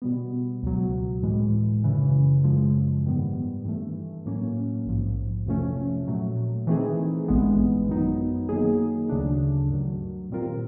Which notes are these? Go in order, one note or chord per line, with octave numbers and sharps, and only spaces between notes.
B2 G3 B3
C#2 B2 F#3
A2 E3 G#3
F#2 C#3 E3
F#2 C#3 F3 G#3
G#2 D#3 G3 B3
G2 E3 A3
A2 F#3 A#3 C#4
A#1 G#2 F3
F2 C3 F3 A3 C#4
A#2 F#3 A3
E3 A3 C4 D#4 G#4
A1 G2 E3 G#3 B3
F#2 D#3 F#3 B3 D#4
D#3 F#3 A#3 D#4 G#4
D2 C#3 F#3 A3 D4
G2 D#3 F#3
A#2 G3 C4 F4 A#4